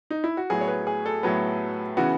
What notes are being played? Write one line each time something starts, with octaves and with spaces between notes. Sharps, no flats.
D#4
E4
F#4
A2 F#3 B3 G#4
C#5
B4
G#4
A4
A2 F#3 B3
C#3 E3 B3 F#4